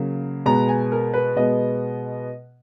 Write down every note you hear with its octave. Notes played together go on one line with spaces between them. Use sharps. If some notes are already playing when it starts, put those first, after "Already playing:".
Already playing: C#3 F#3 A#3
B2 G#3 B3 A#5
G#5
A#4
B4
B2 G#3 B3 D#5